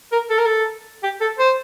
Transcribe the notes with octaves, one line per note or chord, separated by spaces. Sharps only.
A#4
A4
A#4
A4
G4
A4
C5